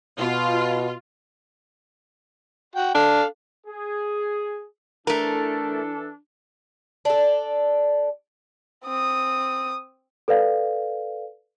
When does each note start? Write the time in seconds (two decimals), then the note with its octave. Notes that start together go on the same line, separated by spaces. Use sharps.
0.18 B2 F4
2.75 F#4 G5
2.95 D4 A4 F5
3.67 G#4
5.07 E3 A3 D4 A4 A#4
7.05 D4 A4
8.85 C4 D#6
10.28 A4 B4 D5 F5